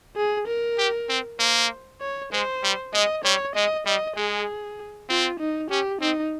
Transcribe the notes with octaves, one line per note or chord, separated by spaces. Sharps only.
G#4
A#4
G4
C4
A#3 C5
C#5
G#3 C5
G3
G#3 D#5
G3 C#5
G#3 D#5
G3 D#5
G#3 G#4
C4 F4
D#4
C#4 G4
C4 D#4